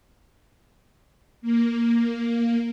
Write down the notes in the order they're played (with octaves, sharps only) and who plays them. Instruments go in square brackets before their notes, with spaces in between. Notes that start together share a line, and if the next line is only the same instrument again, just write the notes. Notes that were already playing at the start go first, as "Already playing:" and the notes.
[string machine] A#3